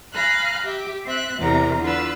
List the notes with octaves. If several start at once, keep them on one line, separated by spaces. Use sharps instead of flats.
F5 G#5 A#5 B5 F6 F#6
G4 E5
C4 E5 F#6
E2 C3 A#4 A#5
D3 F4 B4 E6